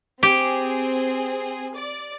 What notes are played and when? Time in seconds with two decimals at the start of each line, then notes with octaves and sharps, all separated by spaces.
0.23 C4 G4 G#4
1.74 D5